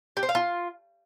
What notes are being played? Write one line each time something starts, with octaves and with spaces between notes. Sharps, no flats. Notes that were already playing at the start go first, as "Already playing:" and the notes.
G4
C5
F5
F4